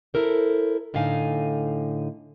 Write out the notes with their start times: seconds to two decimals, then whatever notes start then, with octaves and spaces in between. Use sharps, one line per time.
0.14 E4 A4 A#4 C5
0.94 A2 D3 D#4 F5 G#5